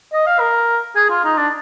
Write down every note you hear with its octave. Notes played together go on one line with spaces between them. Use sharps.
D#5
F5
A#4
G#4
F4
D#4
D4